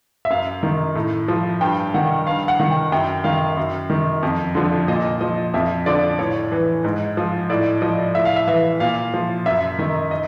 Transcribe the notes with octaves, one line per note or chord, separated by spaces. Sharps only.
E5
F#2 F5
D#3
A2
F3
G2 G5
D#3 F#5
G2 F5
F#5
D#3
G5
F#2 G5
D#3 F5
F#2
D#3
F2
D3 F3
A#2 D#5
F3 D#5
F2 E5
D3 F3 D5
A2 C#5
E3
G#2
F3
A2 D5
F3 D#5
A2 E5
F5
E5
E3 E5
A#2 F5
F3
F#2 E5
D#3 D#5
D#5